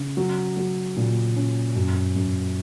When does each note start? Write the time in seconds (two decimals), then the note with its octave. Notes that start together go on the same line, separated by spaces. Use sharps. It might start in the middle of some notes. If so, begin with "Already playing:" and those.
Already playing: C#3
0.17 F#3
0.57 F#3
0.97 A#2
1.36 C#4
1.75 F#2
2.16 F#2